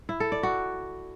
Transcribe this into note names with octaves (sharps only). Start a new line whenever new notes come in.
E4
A4
D5
F#4